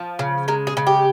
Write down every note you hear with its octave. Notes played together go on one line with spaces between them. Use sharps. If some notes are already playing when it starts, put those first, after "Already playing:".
Already playing: F3
C#3
G#3 A#4
G#4
C#3
G4